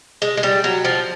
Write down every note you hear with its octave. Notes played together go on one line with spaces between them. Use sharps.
G#3
G#3
G3
F#3
F3